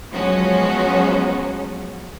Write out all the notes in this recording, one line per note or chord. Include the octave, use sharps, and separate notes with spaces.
F3 F#3 G#3 B3 C#4 F#4